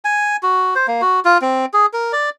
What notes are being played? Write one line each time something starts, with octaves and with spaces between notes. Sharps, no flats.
G#5
F#4
C5
A#3
F#4
F4
C4
G#4
A#4
D5